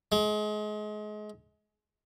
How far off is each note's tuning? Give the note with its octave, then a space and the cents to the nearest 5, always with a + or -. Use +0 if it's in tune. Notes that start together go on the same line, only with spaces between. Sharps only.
G#3 +30